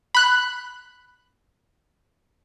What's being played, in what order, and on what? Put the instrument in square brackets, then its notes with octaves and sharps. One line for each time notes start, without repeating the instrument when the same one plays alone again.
[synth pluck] B5 F#6